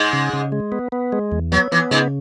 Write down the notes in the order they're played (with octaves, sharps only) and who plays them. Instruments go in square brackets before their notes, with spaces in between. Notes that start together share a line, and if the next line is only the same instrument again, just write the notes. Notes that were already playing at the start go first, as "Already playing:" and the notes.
Already playing: [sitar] G#2 G#3
[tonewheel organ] C#3
C#3
G#3
B3
B3
G#3
E2
[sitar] F#3 [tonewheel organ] B3
[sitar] E3 [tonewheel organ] B3
[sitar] G#2 G#3 [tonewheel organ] C#3